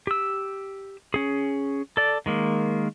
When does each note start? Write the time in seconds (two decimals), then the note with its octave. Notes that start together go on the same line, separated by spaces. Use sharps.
0.07 G4 E6
1.14 C#4 G#4
1.97 A4 D5
2.26 D#3 G#3 A#3